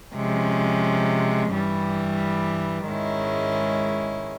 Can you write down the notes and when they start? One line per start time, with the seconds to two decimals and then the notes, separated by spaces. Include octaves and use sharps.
0.15 C3 F3 G#3 C#4
1.51 G2 E3 G3
2.87 G#2 D#3 G#3 C#4 E4